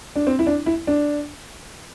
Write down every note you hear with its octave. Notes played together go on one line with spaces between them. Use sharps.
D4
C4
E4
D4
E4
D4